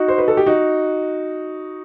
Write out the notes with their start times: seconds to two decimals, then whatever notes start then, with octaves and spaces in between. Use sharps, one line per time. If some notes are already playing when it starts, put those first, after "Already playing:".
Already playing: D#4 F#4
0.08 C5
0.18 B4
0.28 A4
0.37 G4
0.46 D#4 F#4